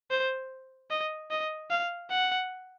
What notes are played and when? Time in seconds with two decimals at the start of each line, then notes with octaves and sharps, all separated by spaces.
0.11 C5
0.91 D#5
1.31 D#5
1.70 F5
2.10 F#5